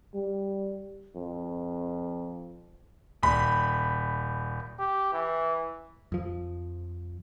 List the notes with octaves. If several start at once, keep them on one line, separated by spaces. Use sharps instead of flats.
G3
F2
D#1 B5
G4
E3
F2 F3